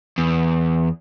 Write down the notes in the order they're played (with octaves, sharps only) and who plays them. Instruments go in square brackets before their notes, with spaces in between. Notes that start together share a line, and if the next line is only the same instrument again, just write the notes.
[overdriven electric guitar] E2